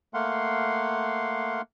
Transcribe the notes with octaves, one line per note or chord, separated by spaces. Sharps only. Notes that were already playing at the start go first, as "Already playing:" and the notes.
A3 A#3 F5 F#5 C6